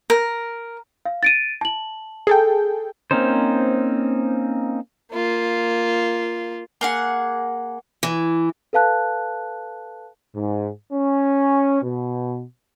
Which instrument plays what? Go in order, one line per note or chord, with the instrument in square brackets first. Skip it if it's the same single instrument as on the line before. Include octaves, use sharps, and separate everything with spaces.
[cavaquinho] A#4
[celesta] F5
A6 D7 D#7
A5 F#7
[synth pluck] G#4 A4 G5
[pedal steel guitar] A#3 C4 C#4 D#4 C5
[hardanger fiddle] A#3 F4
[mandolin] A#3 G#4 F#5
[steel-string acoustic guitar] E3
[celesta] A4 B4 F5 A5 F#6
[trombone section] G#2
C#4
B2